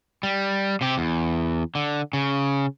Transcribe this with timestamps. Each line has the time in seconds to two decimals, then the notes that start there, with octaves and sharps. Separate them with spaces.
0.23 G3
0.81 C3 G4
0.98 E2
1.75 D3
2.13 C#3